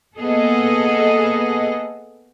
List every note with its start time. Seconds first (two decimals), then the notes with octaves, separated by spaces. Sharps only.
0.18 A#3 B3 G#4 A4 D#5